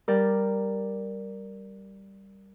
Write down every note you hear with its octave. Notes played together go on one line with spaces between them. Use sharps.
G3 A#4 D5 G5 F6